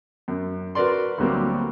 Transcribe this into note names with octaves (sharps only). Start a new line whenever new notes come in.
F#2
F#4 A#4 B4 D5 C6
D2 D3 F#3 G3 A#3 C4